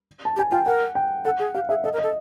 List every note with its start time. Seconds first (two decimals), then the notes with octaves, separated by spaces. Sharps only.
0.25 A5
0.36 G4 G#5
0.51 F4 G5
0.66 A#4 F#5
0.95 G5
1.25 A4 F#5
1.39 G#4
1.55 G4 F5
1.69 G#4 E5
1.84 A4 D#5
1.93 A#4
1.98 D#5
2.03 A4